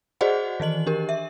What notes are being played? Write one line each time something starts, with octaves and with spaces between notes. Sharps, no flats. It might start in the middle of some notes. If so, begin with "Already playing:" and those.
F#4 G#4 C5 D5 D#5 F#5
D#3 E3 D#5 F#7
D4 G4 A#4
E5